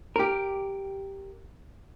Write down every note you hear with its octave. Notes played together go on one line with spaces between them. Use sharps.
G4 A#4